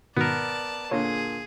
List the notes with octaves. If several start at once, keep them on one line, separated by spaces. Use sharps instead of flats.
G#2 B2 D#3 B3 A#4 D5 A5
A#2 D3 G#4 C#5 A#5